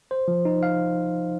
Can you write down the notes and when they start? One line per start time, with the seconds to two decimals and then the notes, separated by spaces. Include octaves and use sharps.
0.11 C5
0.28 F3
0.45 D#4
0.63 F5